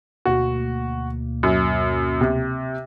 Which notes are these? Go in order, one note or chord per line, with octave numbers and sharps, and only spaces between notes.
D2 B2 A#3 F#4
F#2
C3